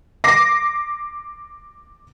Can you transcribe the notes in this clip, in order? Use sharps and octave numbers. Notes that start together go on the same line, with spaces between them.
D6 A#6 C7